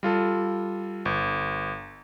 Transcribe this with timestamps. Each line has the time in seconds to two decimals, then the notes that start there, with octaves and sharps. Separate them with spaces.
0.03 G3 F4 A4
1.05 G1